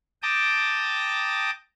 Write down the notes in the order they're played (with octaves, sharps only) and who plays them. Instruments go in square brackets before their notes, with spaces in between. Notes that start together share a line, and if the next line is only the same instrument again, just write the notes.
[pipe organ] G5 A5 A#5 D6 D#6